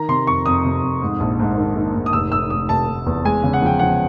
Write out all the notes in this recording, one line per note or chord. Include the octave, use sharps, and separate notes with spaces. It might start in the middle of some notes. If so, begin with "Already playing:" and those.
Already playing: D#3 A#5
C3 C6
F2 C#6
F2 D#6
C3
F2
G#2
A#1
G#2
D#3
D#3
G#2
D#6
F1 E6
F1 E6
F1 D#6
F1 A5
F1
E2
G#3 G#5
C#3
F#5
F3 G5
F3 F#5